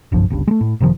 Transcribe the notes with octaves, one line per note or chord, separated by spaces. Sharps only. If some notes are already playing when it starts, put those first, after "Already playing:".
F#1 B1 G2 F3
G1 C#2 G2
G#3 A3
A2
F#1 C3 D#3 F3